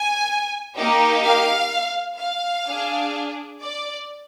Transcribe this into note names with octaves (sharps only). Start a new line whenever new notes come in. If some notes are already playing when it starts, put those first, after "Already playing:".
Already playing: G#5
A#3 D#4 G4
F5
F5
D4 G#4
D5